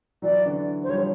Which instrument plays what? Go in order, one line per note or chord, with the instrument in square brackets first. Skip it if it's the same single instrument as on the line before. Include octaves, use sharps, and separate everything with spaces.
[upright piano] E3 F#3 [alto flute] D5
[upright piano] D3 E3
[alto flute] C5
[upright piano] F3 G3 [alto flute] C#5